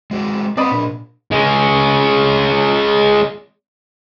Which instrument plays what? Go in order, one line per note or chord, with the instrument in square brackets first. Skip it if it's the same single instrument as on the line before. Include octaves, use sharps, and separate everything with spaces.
[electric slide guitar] G#3 F#4 D5
[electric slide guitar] C4 B4 [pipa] D5 D#5 B5
[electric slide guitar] A#2 D4
[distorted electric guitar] G#3 C#4